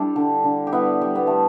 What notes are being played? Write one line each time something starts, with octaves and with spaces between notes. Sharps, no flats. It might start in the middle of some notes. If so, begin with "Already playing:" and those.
Already playing: G3 D4 E4 G4 A4
D3
D3
G4
G3 B3 E4
G3
B3
G3 A3